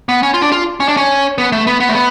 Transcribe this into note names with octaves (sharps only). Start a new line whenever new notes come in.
B3
C#4
F4
D4
F4
C#4
D4
C#4
B3
A3
B3
B3
A3
B3